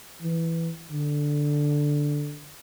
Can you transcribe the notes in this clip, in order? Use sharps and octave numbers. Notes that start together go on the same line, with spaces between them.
E3
D3